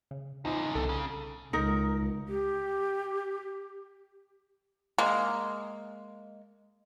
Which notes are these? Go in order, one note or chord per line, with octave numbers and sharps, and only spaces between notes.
C#3
E2 C#3 F3 D#4
C2 A4
C#3
C#2 D#4 A#4
G4
G#3 A#3